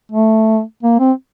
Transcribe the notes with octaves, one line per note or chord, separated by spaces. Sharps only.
A3
A#3
C4